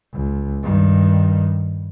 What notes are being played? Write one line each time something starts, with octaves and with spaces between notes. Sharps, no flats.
C#2
G2 D#3